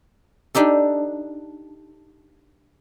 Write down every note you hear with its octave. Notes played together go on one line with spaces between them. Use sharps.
D4 D#4 G4 A4